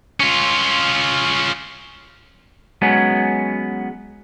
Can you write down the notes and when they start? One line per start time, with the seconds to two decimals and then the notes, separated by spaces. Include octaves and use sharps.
0.20 C#4 F4
2.82 F#3 G#3 B3 C#4